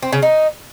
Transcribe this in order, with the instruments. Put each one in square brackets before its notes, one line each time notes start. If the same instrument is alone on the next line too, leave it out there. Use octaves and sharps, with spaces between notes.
[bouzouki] C4
C#3
D#4